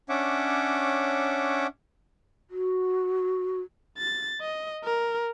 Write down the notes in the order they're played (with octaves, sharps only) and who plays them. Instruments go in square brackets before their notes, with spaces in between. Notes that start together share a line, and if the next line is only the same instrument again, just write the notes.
[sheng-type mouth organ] C#4 D4 C#5 E5 F#5 D6
[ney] F#4
[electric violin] A6
D#5
A#4